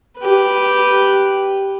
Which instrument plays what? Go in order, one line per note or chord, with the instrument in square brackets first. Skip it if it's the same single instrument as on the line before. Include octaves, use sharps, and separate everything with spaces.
[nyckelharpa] G4 B4